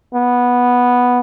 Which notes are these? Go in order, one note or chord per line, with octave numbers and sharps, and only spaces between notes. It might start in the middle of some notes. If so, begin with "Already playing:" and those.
B3